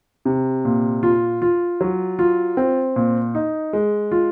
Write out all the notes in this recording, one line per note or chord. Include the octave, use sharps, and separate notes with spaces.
C3
A#2
F4
F4
F#3
F4
C4
A#2
D#4
G#3
F4